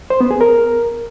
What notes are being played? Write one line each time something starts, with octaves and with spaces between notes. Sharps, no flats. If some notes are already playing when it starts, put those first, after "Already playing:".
C5
B3
G#4
A#4